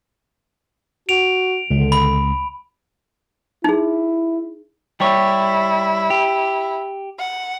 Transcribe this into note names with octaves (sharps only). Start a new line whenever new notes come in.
F#4 D7 F7
C#2 D3
B5
D#4 E4 G#4
G3 E4 G4 C#5
G4
F#5